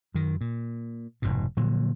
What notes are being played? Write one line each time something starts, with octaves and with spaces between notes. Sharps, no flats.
F#2 D#3
A#2
F1 G#2 B2
A#2 D3 F3 F#3